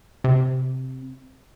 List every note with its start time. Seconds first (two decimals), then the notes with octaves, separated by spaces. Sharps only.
0.24 C3